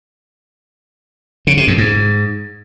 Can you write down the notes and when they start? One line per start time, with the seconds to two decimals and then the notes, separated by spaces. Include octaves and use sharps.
1.47 C#3
1.57 C3
1.68 F2
1.78 G#2